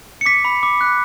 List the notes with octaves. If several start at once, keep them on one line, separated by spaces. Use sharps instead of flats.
C#7
D6 B6
B5
D6
F#6